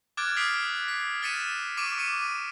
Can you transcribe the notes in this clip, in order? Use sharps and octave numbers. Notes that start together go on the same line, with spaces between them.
D6 F6 F#6 G#6 A6 D7
D#6 F6 B6 C7 D7 F7
B6
F6 A6 B6 C#7 D#7 E7
C#6 D6 B6 D7 D#7
D6 C#7 D#7